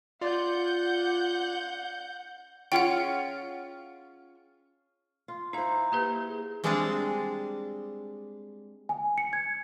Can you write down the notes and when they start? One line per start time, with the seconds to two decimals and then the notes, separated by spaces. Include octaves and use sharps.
0.21 F4 D5 F#5 G6
2.72 C#4 F4 G#4 F#5 G5
5.28 F4
5.53 D#4 E4 C5 F5 A#5
5.92 A#3 E4 G4 B4
6.28 G#4
6.64 G3 G#3 C4 D4 G#4 A5
8.89 G#5
9.18 C#7
9.33 G#6